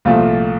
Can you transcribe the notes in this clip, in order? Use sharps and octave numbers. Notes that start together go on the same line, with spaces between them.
C2 A#2 F3 A3 F4